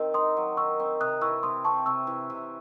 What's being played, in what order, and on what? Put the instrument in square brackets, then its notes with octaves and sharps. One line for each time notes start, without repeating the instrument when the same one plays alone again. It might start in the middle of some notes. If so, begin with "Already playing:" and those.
Already playing: [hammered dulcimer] D#3 C4
[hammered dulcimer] D#4 [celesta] C6 D#6
[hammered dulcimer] F#3
[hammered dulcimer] D#3 [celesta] C#6 E6
[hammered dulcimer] C4
[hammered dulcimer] C3 [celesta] D#6 F#6
[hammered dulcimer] E3 [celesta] C#6 E6
[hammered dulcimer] C3 [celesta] C6 D#6
[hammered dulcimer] C4 [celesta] A5 C#6
[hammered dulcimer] C3 [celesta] C#6 E6
[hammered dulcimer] E3
C3